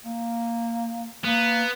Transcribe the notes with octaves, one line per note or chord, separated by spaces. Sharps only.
A#3
A#3 B3